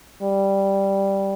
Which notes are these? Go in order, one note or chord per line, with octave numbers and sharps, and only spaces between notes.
G3